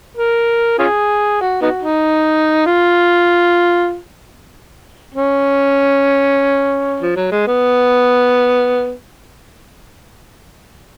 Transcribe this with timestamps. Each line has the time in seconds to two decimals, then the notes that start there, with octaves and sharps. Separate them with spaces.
0.17 A#4
0.79 C#4 F4 G#4
1.41 F#4
1.62 B3 D#4 F#4
1.83 D#4
2.66 F4
5.14 C#4
7.00 F3
7.16 F#3
7.31 G#3
7.47 B3